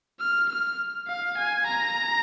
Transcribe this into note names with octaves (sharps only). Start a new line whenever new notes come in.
F6
F6
F5
G#5
A#5